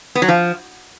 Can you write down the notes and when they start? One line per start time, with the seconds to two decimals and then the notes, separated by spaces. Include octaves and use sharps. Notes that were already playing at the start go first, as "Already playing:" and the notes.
0.15 B3
0.22 F#3
0.28 F3